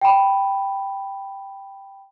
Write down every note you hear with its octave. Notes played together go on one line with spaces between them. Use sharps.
G5 B5